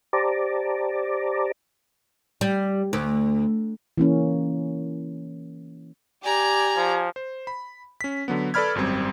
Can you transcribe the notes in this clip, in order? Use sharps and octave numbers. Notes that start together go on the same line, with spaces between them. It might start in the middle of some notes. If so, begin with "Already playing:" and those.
G4 C5 D5 A5 A#5 D6
G3
D2
E3 A#3 C#4
G4 D5 G#5 A#5
F3
C5
B5
C#4 B6
D3 F#3 B3
A4 B4 D5 B5 F6 G#6
G#1 F#2 G3 C4